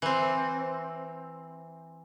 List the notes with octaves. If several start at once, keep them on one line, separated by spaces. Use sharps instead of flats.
E3 C4